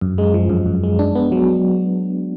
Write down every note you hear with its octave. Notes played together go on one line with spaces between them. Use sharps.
F#2
G#3
F3
F#2
F#2
G#3
D4
B3
F#3